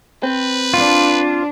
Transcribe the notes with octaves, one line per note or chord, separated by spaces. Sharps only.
C4 B4
D4 F4